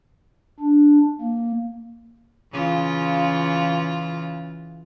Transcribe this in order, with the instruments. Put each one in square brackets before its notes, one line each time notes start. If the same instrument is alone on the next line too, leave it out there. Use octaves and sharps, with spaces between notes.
[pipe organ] D4
A#3
[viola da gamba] C#3 E3 F4